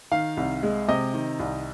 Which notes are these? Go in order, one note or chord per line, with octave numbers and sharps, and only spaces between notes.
D#3 F5
C2
G#3
C3 D#5
D#3
C2